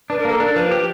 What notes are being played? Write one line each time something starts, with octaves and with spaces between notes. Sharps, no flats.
D4 B4
A#4
A#3 A4
D4 A#4
F3 B4
G4